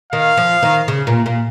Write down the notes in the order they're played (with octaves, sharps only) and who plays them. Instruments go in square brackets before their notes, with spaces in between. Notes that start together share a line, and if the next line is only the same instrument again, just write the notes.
[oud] D#3 [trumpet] F5
[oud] F3
D#3
C#3
A#2
A#2